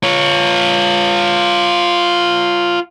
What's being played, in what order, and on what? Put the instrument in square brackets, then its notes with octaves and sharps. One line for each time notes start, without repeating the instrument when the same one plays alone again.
[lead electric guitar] F4 C#5